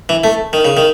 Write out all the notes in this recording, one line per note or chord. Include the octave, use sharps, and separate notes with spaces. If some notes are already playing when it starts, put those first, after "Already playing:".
E3
A3
D#3
C#3
D#3